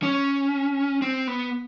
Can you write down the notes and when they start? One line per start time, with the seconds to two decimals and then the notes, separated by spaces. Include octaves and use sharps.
0.03 C#4
1.02 C4
1.27 B3